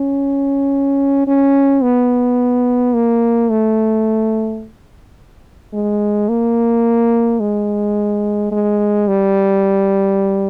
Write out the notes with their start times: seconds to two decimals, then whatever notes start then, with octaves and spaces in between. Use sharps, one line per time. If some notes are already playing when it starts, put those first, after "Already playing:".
Already playing: C#4
1.27 C#4
1.83 B3
2.95 A#3
3.50 A3
5.73 G#3
6.29 A#3
7.40 G#3
8.52 G#3
9.08 G3